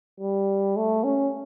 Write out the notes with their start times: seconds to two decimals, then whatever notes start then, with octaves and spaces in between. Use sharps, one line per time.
0.20 G3
0.77 A3
1.04 C#4